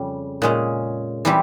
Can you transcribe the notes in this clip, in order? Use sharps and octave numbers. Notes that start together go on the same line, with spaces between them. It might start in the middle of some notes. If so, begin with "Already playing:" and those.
Already playing: F2 C#3 G3
A#2 G#3 C#4
E3 G3 C4 G4